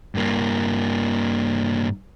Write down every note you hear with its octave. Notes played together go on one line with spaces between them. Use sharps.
G2 A#3